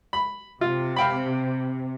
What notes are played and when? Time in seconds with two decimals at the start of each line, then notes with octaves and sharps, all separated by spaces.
0.13 B5
0.61 C3 F4
0.96 F5 G5 B5